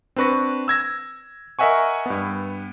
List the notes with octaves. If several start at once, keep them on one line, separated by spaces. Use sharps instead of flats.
C4 D4 B4 C#6 A#6
E6 G#6 A#6
A#4 D#5 E5 F#5 G#5 C#6
G2 B3